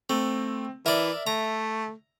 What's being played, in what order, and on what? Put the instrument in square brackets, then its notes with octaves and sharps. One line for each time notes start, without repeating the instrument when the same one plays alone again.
[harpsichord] A3 [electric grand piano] C4
[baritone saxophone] E3 [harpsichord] A#4 D5 [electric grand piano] E5
[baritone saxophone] A3 [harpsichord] A#5